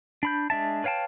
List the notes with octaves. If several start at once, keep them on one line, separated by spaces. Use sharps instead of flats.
D4 B5 G6
G#3 D4 E5 A5
B4 C#5 F5 G5 A5